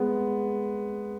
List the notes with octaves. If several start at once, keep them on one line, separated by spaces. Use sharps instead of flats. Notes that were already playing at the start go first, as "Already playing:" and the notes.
Already playing: G#3 B3